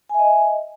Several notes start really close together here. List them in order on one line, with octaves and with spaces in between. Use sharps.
G#5 E5 D#5